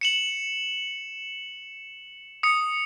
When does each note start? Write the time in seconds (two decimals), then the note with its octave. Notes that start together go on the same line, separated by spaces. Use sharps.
0.01 C#7 E7 F#7
2.43 D#6 C#7